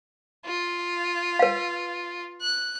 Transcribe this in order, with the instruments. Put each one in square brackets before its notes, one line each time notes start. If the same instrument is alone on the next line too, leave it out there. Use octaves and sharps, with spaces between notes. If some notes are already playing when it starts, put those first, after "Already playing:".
[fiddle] F4
[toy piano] B4 F5
[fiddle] F#6